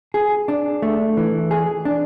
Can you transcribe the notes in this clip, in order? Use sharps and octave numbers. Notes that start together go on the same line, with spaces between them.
G#4
D4
A3
E3
G#4
D4